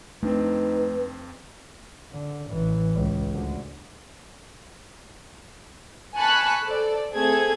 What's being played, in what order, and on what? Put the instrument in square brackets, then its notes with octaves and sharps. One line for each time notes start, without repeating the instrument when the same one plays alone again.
[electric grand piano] F2 C4 [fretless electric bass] A3 D4 [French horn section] D#4 [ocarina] B4
[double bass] D3
A1 E3
C#2
D2 D3
[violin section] G#5 A5 B5 C#6 F#6
A4 C5 D5
A3 C4 G#4 A4 G#6